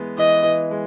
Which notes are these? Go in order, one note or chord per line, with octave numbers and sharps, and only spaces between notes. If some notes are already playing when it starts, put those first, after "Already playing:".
Already playing: E3 G#3 B3
E3 D#5
E3
G#3